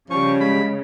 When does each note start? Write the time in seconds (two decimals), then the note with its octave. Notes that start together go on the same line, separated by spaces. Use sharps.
0.10 C#3 F3 G3 C#4 C#6
0.40 G#3 B5